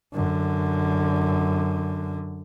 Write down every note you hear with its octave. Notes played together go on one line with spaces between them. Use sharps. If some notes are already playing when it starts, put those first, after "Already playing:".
F#2 D3